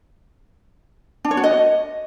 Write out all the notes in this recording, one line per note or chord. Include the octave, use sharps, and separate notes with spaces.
D4
C#5
F#4
D#5